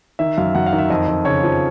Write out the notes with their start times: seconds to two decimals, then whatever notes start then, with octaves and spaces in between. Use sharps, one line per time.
0.19 D#3 E5
0.38 F#2 F5
0.55 F#2 F#5
0.66 F5
0.73 D#3
0.78 E5
0.90 F2 D#5
1.08 F2
1.25 C#3 C#5
1.44 F3